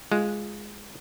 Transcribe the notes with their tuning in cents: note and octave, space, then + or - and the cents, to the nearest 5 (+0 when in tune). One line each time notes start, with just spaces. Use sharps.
G#3 +0 F4 +0